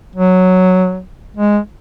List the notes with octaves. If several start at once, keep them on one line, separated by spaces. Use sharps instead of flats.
F#3
G#3